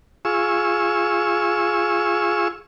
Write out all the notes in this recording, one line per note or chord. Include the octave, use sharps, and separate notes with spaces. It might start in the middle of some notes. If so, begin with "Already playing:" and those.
F4 G#4 C#6 E6